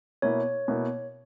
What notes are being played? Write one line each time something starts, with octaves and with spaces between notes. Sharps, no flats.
B2 A#3 E4 C#5
B2 A#3 E4